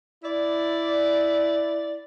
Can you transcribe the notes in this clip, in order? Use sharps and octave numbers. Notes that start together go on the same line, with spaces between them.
E4 D5